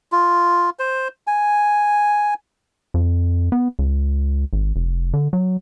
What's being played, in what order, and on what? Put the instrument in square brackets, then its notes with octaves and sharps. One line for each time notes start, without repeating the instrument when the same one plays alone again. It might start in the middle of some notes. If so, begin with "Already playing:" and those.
[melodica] F4
C5
G#5
[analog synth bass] F2
B3
C#2
G#1
F1
D3
F#3